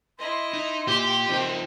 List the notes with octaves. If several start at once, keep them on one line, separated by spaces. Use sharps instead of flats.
E4 D#5 C6
D#4
A#2 G4
F3 C4 D#4 A#4